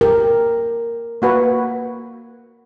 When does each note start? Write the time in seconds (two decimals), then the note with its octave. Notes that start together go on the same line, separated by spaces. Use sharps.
0.01 G4 A#4
1.22 A#3 F#4 B4